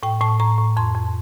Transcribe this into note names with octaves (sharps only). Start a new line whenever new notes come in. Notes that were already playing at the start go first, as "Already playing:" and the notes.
A2 G5
A2 A5
A2 A#5
A2
F2 C6
F2